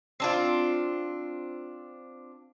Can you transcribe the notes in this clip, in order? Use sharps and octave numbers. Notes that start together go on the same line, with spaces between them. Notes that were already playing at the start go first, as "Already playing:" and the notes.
C4 D4 F4